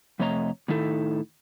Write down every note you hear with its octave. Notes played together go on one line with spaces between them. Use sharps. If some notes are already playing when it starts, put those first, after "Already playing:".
F2 C3 A3 C#5 D#5 A#5
A2 D#3 D#4 E4 A4